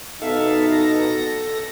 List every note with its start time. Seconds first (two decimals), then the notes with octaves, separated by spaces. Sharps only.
0.22 B2 D#4 A4 E5 F5
0.72 A4 A#6